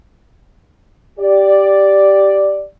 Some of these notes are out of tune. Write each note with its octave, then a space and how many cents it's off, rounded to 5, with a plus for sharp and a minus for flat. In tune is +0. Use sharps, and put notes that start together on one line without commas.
G4 -5 D5 +0